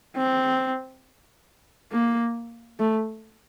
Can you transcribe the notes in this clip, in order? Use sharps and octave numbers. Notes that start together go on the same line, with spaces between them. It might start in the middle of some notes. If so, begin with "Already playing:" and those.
C4
A#3
A3